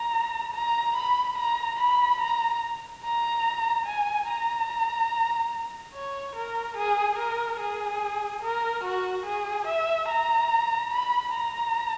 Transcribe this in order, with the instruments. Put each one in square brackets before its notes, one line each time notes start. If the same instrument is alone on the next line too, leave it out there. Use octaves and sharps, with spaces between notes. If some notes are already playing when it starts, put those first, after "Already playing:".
Already playing: [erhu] A#5
A#5
B5
A#5
B5
A#5
A#5
G#5
A#5
C#5
A#4
G#4
A#4
G#4
A#4
F#4
G#4
E5
A#5
B5
A#5